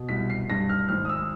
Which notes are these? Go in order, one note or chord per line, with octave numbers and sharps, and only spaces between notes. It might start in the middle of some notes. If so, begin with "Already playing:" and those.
Already playing: B2
C2 B6
C7
G2 A#6
F6
G#1 F6
D#6
E6